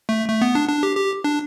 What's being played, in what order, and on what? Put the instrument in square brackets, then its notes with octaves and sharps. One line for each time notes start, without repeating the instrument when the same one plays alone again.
[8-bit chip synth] A3
A3
B3
D4
D4
G4
G4
D4